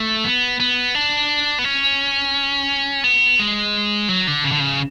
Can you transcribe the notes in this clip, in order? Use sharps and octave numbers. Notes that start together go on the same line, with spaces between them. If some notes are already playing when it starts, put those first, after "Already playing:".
Already playing: A3
B3
B3
D4
B3
C#4
B3
G#3
F#3
D3
C#3
D3
C#3